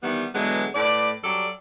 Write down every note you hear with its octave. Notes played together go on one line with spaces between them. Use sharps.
D#3 E3 G3 B3
D3 E3 F#3 G#3 B3
A2 B4 D5
F#3 G3 A4 D5